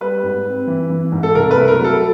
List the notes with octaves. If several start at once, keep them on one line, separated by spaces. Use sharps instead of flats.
G3 B4
G#2
C4
E3
E3
G#2
A4
C2 A#4
B4
A3
A#4
F#3 A4